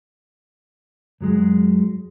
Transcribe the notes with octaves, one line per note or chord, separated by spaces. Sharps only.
F#2 F#3 G#3